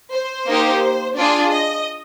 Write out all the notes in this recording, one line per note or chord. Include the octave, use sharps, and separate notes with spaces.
C5
A#3 D#4 G4
D4 F4 G#4 D5
D#5